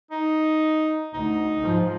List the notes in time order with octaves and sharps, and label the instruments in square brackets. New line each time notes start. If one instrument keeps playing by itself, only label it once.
[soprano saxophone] D#4
[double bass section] D2 [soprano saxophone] D#4
[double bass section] G#2 F3